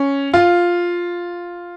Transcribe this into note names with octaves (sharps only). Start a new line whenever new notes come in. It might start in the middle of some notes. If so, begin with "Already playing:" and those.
Already playing: C#4
F4